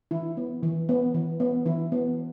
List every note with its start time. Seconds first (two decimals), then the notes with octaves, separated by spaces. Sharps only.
0.11 E3 E4
0.37 B3
0.63 E3
0.89 B3
1.14 E3
1.40 B3
1.66 E3 E4
1.92 B3